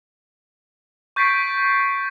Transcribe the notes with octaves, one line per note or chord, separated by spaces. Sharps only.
C#6 G6 A6 B6 C7 D7